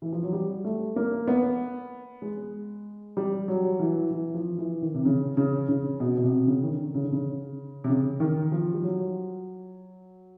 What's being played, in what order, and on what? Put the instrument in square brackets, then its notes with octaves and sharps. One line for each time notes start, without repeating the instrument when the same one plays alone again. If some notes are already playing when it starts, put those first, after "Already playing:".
[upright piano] E3
F3
F#3
G3
A3
A#3
B3
G#3
G3
F#3
E3
E3
F3
E3
D#3
C3
C#3
C#3
C#3
B2
B2
C3
C#3
D#3
D3
C#3
D3
C#3
C3
C#3
D#3
F3
G3
F#3